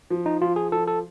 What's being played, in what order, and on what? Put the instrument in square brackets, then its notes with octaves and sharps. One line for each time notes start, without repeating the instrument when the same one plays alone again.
[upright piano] F3
[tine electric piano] D#4
[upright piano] F3 [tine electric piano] F4
[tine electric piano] G#4
[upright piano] F3 [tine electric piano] A4
[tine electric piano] A4